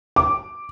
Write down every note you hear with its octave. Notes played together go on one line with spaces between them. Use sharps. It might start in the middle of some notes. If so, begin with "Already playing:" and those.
D6